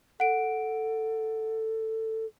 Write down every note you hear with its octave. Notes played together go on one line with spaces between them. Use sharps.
A4 F#5 D7